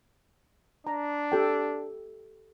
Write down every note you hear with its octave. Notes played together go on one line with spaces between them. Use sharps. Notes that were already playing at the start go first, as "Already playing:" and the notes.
D4 A#5
G4 A4 G5